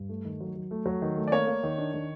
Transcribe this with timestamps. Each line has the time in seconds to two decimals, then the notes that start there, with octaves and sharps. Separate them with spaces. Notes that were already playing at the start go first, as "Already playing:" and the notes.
Already playing: G2
0.09 A3
0.25 D#3
0.40 F#3
0.56 F#3
0.71 A3
0.86 F#3
1.02 D#3
1.17 A3
1.28 D5
1.32 A#3 C#5
1.47 A#3
1.63 D#3
1.78 D4
1.94 D#3